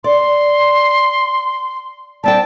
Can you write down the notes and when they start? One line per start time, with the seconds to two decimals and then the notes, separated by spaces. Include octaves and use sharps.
0.04 D5 C6
2.24 G3 C4 G5 A5